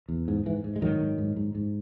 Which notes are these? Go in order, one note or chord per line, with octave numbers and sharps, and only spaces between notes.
E2
G#2
G#2 E3
G#2
G#3
G#2 D#3 F#3
G#2
G#2
G#2
G#2